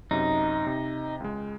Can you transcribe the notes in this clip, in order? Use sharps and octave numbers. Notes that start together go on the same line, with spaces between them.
F#2 C3 D#4
C3
C#2 G#3